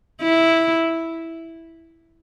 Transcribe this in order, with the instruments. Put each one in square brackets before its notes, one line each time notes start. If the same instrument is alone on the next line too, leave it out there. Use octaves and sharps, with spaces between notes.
[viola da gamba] E4